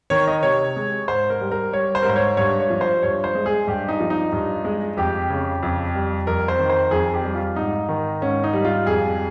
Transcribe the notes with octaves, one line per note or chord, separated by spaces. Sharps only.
D#3 C#5
D#5
C3 C#5
G#3
G#2 C5
A#4
G3
A#4
G3 C#5
C5
A#4
G#2 C5
C#5
G2 C#5
C#5
F3
C5
G2 C#5
C5
G#3
G#4
G2 G4
D#4
F3
D#4
G2
G#3
F2 G4
C#3
F2
G3
F2 A#4
C5
D#3
C5
F2 G#4
G4
G3
F4
G#2 D#4
D#3
G#2 C#4
D#4
G3
F4
F2 G#4